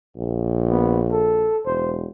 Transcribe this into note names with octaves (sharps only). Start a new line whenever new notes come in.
A#1
B3
A4
E1 C5